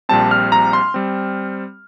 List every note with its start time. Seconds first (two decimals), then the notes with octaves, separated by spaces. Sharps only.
0.09 A#1 A#2 G3 C4 A5
0.31 F6
0.52 A#5
0.73 C6
0.94 G3 C4